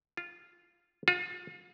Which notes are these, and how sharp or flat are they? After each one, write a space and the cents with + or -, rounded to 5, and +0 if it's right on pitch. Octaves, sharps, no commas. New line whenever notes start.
F4 -5
F4 +35